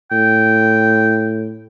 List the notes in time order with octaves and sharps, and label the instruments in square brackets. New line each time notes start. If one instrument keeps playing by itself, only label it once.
[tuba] A2 [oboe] G5